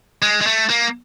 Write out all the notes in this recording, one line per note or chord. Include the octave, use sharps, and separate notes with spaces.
G#3
G#3
A3
A#3